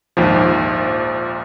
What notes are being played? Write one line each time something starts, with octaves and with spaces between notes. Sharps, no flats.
A#1 D#2 G#2 F3